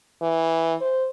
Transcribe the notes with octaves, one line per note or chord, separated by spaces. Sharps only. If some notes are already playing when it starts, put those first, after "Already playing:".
E3
C5